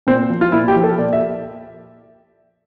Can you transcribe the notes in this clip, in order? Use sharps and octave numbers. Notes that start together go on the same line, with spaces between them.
A#2 C4
F3
F4
A#2 E4
G4
F3
A4
A#2 D5
E5